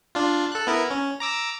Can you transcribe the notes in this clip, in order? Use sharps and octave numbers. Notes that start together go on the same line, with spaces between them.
D4 F4
A4 F#6
B3 E4 A#4
C#4
A#5 D6 E6